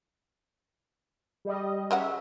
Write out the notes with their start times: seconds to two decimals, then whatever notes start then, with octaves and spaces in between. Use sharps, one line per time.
1.45 G3 D#5
1.91 C#3 F#3 E5 F#5